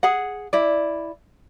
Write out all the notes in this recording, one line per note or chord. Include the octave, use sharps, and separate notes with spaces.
G#4 F#5
E4 D5